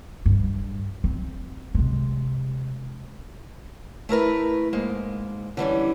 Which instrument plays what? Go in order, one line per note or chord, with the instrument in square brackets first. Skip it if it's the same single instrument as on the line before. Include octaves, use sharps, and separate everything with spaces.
[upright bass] G2
C4
C3 G#3
[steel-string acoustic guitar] A3 E4 A#4 B4
G#2 G#3 A#3
D3 E3 G3 C#4